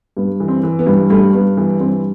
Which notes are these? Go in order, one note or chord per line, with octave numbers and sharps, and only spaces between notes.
G2 B3
E3
C4
E3
B3
G2
G2 A3
G2 B3
E3 B3
G2 C4